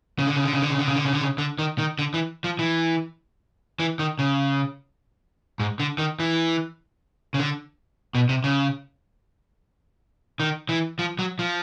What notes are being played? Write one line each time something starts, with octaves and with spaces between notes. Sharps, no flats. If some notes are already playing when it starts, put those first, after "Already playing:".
C#3
D3
C#3
D3
C#3
D3
C#3
D3
C#3
D3
C#3
D3
C#3
D3
D#3
D#3
D3
E3
F3
E3
E3
D#3
C#3
G#2
D3
D#3
E3
C#3
D3
B2
C3
C#3
D#3
E3
F3
F#3
F3